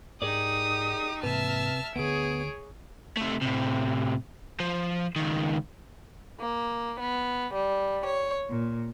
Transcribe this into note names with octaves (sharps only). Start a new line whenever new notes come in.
G#2 D#4 G4 G#4 A#4 D5 D#6
G#2 C3 E3 A#3 B4 E5 A5 F6
D2 D3 B3 G#4 C#5 D7
C3 A3
A2 C3
F3
C#2 D#3
A#3
B3
G3
C#5
A#2